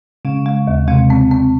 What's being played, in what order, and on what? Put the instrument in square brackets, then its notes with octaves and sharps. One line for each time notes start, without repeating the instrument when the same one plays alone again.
[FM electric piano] C#3 [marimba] G#3
[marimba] G#3
D#2
[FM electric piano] C3 [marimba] G#3
[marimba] C4
C4